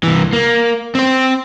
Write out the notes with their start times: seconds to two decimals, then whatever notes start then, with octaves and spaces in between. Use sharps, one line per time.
0.03 C2 E3
0.33 A#3
0.95 C4 C5